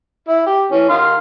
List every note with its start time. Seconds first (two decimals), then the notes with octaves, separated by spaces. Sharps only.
0.28 E4
0.47 G4
0.72 E3 C#4
0.89 D#3 F5 C6